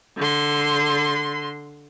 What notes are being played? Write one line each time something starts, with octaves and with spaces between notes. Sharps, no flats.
D3 C6